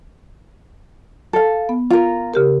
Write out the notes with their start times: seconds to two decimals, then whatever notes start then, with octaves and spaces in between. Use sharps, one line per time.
1.33 A4 F5
1.69 B3
1.90 F4 A#4
2.34 C#3 G4 A#4